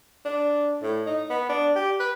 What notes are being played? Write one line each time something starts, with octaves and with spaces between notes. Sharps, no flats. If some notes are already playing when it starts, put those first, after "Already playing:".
D4
A2
D#4
B3
D4
G4
B4